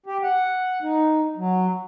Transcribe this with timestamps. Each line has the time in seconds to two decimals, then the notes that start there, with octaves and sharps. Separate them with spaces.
0.06 G4
0.23 F#5
0.82 D#4
1.37 F#3